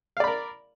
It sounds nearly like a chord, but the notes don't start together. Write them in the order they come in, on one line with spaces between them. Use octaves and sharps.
F5 D5 B5 A#4